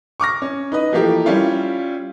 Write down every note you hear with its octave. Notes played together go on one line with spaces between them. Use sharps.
C#6 D6 F6 A#6
C#4
D#4 B4 D#5
E3 F3 A3 A#3 G4
G3 C#4 E4 F4